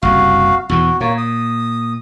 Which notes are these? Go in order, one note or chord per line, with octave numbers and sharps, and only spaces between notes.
F#1 C2 F#4 F5
E2 B2 E3 F#4
A#2 A#3 C#5
D#6